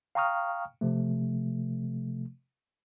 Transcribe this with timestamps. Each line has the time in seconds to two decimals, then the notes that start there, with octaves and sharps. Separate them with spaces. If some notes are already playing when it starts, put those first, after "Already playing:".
0.15 F5 G5 A#5 C#6 D#6 F6
0.81 C3 F3 A3